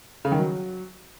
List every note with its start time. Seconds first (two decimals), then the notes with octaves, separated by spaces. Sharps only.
0.25 C#3
0.32 D#3
0.39 F#3